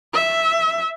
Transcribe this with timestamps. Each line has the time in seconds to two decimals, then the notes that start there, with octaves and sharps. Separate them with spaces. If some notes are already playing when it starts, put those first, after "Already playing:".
0.14 E5